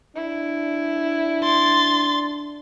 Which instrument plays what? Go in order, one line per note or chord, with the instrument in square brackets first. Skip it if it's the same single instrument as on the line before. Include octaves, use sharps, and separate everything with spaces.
[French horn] D4 [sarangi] E4
[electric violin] C6 A6